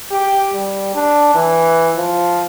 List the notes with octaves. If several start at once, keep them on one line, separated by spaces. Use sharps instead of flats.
G4
G3
D4
E3
F3